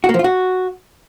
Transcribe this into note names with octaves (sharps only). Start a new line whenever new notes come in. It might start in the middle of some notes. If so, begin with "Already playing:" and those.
F#4
A#3
F3
F4
F#4